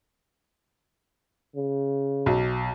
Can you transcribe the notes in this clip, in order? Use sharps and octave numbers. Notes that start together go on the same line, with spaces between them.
C#3
B1